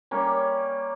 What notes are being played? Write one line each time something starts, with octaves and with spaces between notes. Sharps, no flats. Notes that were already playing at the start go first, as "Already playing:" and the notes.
G3 A#3 C#4